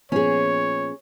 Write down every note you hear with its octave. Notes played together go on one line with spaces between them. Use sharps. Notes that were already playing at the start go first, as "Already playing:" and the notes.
A#2 F3 B3 C#4 G#4 C#5